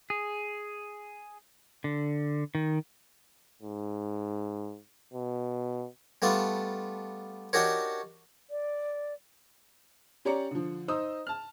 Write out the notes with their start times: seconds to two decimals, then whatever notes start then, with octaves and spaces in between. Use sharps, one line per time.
0.10 G#4
1.84 D3
2.55 D#3
3.63 G#2
5.13 B2
6.22 G3 A3 B3 D4 F4
7.53 D4 D#4 F#4 G4 A#4 C#5
8.50 D5
10.25 C#4 G4 C#5 D5 A#5 C#7
10.51 D3 F3
10.88 D#4 C5 D#5 A#5 D#6 E6
11.27 A5 F6